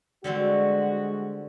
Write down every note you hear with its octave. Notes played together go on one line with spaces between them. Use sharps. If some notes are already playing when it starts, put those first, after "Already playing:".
D3 G3 G#3 C4 F#4